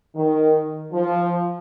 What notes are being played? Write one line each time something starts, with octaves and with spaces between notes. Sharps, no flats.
D#3
F3